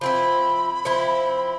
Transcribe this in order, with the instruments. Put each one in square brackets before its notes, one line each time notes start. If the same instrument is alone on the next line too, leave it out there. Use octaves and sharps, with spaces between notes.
[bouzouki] F3 C4 E4 [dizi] B5
[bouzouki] F3 C4 E4